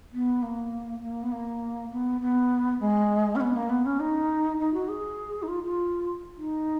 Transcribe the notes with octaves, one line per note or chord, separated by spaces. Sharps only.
B3
A#3
A#3
B3
A#3
B3
B3
G#3
C#4
B3
A#3
B3
C#4
D#4
D#4
F#4
G#4
D#4
F4
F4
D#4